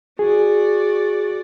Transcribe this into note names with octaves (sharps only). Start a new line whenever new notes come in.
F#4 G#4 D5